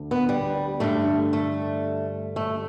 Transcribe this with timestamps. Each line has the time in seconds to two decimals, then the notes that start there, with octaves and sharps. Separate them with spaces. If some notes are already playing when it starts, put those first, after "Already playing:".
Already playing: D2 D3
0.11 B3
0.29 G3
0.80 G2 D3 G3 A3
1.33 A3
2.36 A3